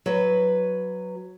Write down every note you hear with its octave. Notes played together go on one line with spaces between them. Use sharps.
F#3 B4